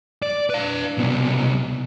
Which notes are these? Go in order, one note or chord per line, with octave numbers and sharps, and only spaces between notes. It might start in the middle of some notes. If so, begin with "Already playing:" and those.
D5
B4 F5
C2 B2